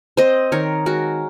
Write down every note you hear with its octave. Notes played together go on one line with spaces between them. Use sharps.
C4 C5 D#5
D#3 A#4 C#5
G#3 F#4 A#4